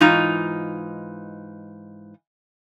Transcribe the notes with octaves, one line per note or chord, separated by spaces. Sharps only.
G#2 E3 D#4 F4 A#5